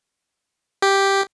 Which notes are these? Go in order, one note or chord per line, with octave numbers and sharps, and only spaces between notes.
G4